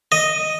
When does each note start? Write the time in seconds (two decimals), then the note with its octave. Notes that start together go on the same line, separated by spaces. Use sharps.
0.12 D#5